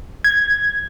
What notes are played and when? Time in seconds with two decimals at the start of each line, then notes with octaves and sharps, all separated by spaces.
0.24 G#6